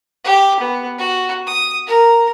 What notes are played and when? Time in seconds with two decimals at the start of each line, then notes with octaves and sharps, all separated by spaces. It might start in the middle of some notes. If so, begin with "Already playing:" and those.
0.24 G4
0.60 B3
0.99 F#4
1.47 D#6
1.87 A#4